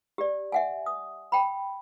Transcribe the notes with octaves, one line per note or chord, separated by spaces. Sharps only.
G4 D5
E5 F#5 G#5
D#6
G5 B5